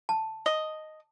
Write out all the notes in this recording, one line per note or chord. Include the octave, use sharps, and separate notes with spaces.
A5
D#5